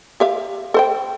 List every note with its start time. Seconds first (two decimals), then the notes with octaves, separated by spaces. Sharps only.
0.20 G4 E5 F5
0.74 A4 C5 G5